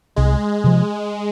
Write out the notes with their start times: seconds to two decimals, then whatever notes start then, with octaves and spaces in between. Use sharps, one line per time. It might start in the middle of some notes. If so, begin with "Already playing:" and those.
0.16 C2 G#3
0.64 C3 F3